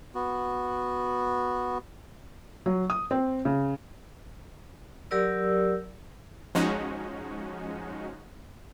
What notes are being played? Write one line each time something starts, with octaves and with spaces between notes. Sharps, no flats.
B3 F#4
F#3
D#6
C4
C#3
F#3 G4 A#4 D5 E6
F3 G#3 C#4 D#4 F#4